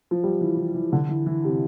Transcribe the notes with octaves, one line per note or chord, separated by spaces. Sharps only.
F3
G3
E3
E3
E3
D3
E3
E3
C3